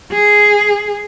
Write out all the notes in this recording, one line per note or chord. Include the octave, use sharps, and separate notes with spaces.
G#4